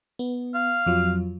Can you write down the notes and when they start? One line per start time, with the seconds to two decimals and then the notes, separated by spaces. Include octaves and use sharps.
0.19 B3
0.54 F5
0.86 F2 F#3 F4